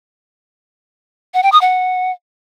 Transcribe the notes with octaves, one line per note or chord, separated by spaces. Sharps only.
F#5
G5
D#6
F#5